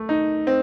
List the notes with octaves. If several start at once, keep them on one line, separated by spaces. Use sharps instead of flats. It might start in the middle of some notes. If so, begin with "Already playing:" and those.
Already playing: A3
D#4
C4